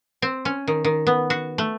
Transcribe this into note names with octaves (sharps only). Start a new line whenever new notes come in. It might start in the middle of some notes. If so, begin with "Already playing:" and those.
C4
C#4
D#3
D#3
B3
F#4
A3